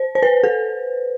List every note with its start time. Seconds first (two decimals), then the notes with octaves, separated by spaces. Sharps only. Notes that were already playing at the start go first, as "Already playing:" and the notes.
Already playing: C5
0.15 C5
0.23 B4
0.44 A4